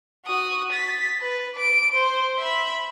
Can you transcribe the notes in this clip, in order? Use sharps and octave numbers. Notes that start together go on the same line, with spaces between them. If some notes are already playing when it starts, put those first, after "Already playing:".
F#4 D#6
A6 B6
B4
D6 D7
C5
E5 B5